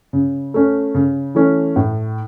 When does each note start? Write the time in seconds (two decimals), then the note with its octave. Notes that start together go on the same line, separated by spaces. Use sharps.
0.13 C#3
0.54 A3 C#4
0.95 C#3
1.35 E3 A3 C#4
1.76 A2